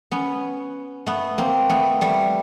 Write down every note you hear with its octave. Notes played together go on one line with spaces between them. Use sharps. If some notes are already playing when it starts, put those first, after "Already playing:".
B3 C#4
A3 B3
A#3 C4
A3 B3
G3 A3